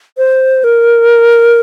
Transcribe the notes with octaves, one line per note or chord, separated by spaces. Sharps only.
C5
A#4